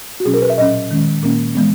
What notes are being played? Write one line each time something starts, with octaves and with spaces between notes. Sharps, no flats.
F#4
B2 F#3 C#4 G#4
A#4
B4
E5
A#2 F#3 C#4 D#5
D#3 G#3 C#4
A#2 A#3 C#4
E3 G#3 B3